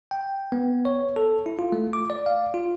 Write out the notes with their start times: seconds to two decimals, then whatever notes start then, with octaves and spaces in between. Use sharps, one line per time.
0.11 G5
0.52 B3
0.85 C#5
1.16 A4
1.46 E4
1.59 F4
1.72 A3
1.93 D6
2.10 D5
2.26 F5
2.54 F4